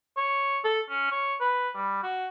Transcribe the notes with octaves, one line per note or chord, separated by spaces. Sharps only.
C#5
A4
C#4
C#5
B4
G3
F#4